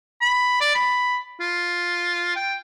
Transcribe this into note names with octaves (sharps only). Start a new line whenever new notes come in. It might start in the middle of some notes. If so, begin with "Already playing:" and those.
B5
D5
B5
F4
G5